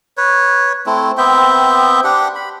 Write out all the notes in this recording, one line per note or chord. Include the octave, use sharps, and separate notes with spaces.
B4 C#5
A3 C4 E4
B3 C4 E5 G5
D4 G4 F#5
B5